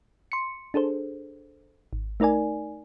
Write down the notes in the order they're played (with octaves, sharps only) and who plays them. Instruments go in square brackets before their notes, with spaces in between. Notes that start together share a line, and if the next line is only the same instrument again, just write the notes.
[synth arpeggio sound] C6 C#7
D4 G#4 A4 C5
G#1
A3 D#4 A#4 D5 G#5